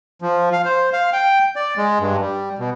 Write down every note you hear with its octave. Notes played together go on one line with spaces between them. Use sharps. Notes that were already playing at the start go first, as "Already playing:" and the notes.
F3
F5
C5
F5
G5
D5
G#3
G2
G3
B2